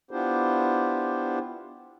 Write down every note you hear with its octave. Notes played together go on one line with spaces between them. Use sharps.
B3 D4 E4 F4 G4 C5